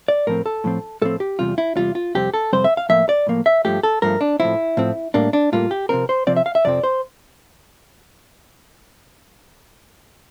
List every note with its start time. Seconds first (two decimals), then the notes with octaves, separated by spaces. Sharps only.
0.08 D5
0.27 A2 F3 C4 A#4
0.46 A4
0.64 A2 F3 C4
1.02 A2 F3 C4 A4
1.20 G4
1.39 E2 C3 G3 F4
1.58 E4
1.76 E2 C3 G3 F4
1.95 F4
2.15 F2 C3 G3 C4 G4
2.34 A4
2.53 F2 C3 G3 C4 C5
2.64 E5
2.77 F5
2.89 A2 F3 A#3 E5
3.09 D5
3.27 A2 F3 A#3
3.46 E5
3.65 G2 F3 A3 G4
3.83 A4
4.02 G2 F3 A3 A#4
4.21 D4
4.40 A2 F3 C4 E4
4.77 A2 F3 C4
5.14 A2 G3 A#3 D4
5.33 D4
5.52 A2 G3 A#3 F4
5.71 G4
5.89 C3 F3 C4 A#4
6.09 C5
6.27 C3 F3 C4 D5
6.37 E5
6.46 F5
6.55 E5
6.65 F2 C3 F3 C4 D5
6.84 C5